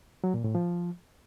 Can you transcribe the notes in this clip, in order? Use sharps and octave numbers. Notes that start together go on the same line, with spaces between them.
F#3
A#2
A2
F3